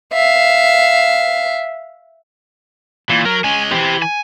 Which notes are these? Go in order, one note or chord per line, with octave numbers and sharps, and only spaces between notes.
E5 F5
A#2 E3
F#3 A#4
G#3 C#4 G#5
E3 G4 C5
G#5